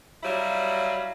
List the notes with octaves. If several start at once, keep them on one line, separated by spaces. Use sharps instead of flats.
F#3 G3 E4 C#5 F5